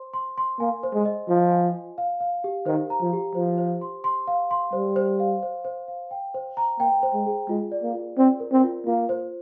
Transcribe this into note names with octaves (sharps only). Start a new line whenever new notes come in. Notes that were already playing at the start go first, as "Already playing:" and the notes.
Already playing: C5 C6
C6
C6
A#3 G#5
C5
G#3
D#5
F3 F4
G#5
G#5
F5
F5
G4
D#3 C5
A#5
F3
G4
F3 C5
C5
C6
C6
F5
C6
G3 C5
C5
F5
C5
C5
F5
G5
C5
A#5
A#3 G5
C5
G#3
G#4
G#3 F4
D5
A#3
F4
C4 D5
A#4
C4
F4
A#3 F4
C5